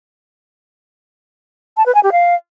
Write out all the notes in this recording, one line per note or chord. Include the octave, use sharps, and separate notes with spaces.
A5
B4
G#5
G4
F5